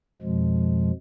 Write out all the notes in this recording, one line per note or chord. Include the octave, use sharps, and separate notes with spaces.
F2 B2 F3 G#3